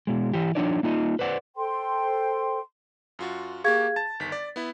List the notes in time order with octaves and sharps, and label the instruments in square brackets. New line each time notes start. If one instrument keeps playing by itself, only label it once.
[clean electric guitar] B2 G#3
E3 G4
F3 A#3 D4 D#4 C#5 D5
A#3 D#4 F4 D#5
B4 C5 D5 F#5
[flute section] A4 C5 G5 C6
[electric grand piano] F#2 F4 F#4
[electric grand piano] A#3 G4 C#6 [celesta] G#4 F5 G#6
[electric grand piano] A5 [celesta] A6
[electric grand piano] G1 D#3 B6
D5
B3 E4